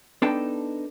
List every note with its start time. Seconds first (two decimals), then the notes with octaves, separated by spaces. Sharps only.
0.22 B3 D4 D#4 A4 G5 A5